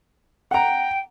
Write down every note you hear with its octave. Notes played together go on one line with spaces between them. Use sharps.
F#5 G5 A#5